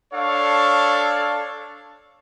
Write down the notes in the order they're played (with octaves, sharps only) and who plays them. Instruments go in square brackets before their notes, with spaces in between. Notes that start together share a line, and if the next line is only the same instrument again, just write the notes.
[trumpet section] D4 A4 C#5 F5